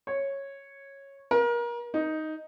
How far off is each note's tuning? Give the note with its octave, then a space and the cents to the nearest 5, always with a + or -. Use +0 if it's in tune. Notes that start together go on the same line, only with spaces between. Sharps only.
C#5 -10
A#4 +30
D#4 +5